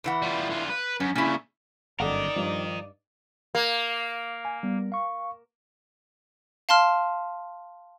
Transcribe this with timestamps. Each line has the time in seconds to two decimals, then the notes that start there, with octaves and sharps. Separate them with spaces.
0.04 E2 E3 F#5
0.22 G3 F4
0.50 D3 F4
0.70 B4
1.00 F#2 C#4
1.16 A#2 C#3 C#4 E4
2.00 G1 F#2 D#4 A4 A#4 D5 D#5 F#5
2.36 G2 F3
3.55 A#3
4.45 G#5
4.63 G3 B3
4.92 F5 C#6
6.69 F5 A5 C6 F6